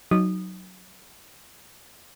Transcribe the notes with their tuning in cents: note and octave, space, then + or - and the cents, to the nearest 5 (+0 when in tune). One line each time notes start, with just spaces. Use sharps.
F#3 +0 D#4 +0 D#6 -20